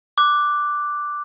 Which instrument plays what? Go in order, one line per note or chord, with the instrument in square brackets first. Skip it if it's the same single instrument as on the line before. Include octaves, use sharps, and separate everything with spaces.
[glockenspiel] D6 F#6